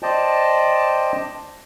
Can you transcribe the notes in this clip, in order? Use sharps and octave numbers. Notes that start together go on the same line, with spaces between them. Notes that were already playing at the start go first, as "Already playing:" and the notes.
C5 D5 D#5 G5 A5